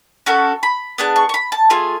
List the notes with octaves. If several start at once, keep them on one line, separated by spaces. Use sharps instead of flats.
C#4 F#4 A4 C#6
B5
B3 D4 G#4 A5
C#6
C#6
B5
A5
A3 F4 G#4 G#5